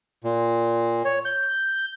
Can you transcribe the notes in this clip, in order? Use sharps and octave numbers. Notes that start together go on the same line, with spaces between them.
A#2
C#5
G6